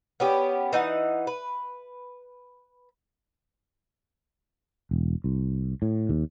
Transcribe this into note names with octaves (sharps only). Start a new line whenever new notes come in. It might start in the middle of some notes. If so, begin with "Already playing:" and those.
B3 C#4 G4
E3 D#4 F#5
B4
E1
C2
A2
D#2